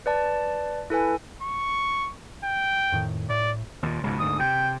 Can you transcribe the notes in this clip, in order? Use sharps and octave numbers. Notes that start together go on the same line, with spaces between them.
B4 D5 A5
E4 A4 B4 G#5
C#6
G5
F2 A2 D#3
A2 D5
D#2 A#2
C#2 G#2 B2
D2 G#2 D#6
C3 G5